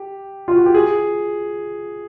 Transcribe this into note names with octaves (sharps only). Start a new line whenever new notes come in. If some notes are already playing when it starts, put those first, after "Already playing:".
Already playing: G4
F4
F#4
G4
G#4